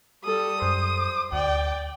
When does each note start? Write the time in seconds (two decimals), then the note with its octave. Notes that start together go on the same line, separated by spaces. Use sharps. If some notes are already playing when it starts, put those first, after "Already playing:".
0.24 G3 A4 D#6
0.62 F#2 C5
1.32 D2 D5 G5